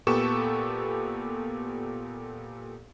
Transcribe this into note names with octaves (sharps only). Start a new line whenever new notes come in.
A#2 B3 G4 A4 C#6 E7